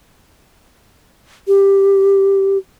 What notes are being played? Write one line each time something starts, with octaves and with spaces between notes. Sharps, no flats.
G4